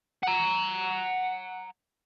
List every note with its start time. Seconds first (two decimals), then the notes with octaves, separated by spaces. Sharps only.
0.23 F#5 A#5